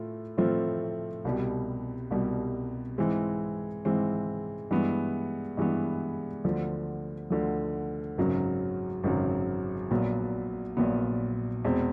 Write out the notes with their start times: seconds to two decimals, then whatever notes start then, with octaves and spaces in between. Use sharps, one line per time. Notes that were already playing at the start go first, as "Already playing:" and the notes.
Already playing: A2 A3 F4
0.38 A2 F3 A3 C4 F4
1.25 C2 B2 G3
2.11 C2 B2 G3
2.98 G#2 E3 G#3 C4
3.85 G#2 E3 G#3 C4
4.71 G2 E3 G#3 B3
5.57 G2 E3 G#3 B3
6.44 D2 D3 F3
7.30 D2 D3 F3
8.18 G#1 F#2 C#3 F#3
9.04 G#1 F#2 C#3 F#3
9.91 A#1 A#2 F#3 B3
10.77 A#1 A#2 F#3 B3
11.65 E2 B2 G#3 C4